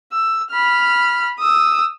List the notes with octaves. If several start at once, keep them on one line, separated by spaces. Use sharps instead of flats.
E6
B5 F6
D#6 E6